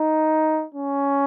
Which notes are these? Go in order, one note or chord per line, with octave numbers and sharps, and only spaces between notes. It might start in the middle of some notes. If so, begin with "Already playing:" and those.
Already playing: D#4
C#4